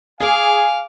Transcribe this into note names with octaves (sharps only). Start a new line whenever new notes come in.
G#4 F5 G#5 D6 F6